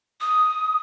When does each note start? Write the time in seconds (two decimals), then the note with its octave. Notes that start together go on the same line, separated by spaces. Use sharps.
0.21 D#6